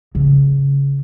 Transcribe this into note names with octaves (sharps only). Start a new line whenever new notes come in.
C#3 C#4